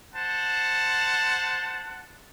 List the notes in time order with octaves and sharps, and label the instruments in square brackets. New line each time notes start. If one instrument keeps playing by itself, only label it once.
[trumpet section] C5 F#5 A5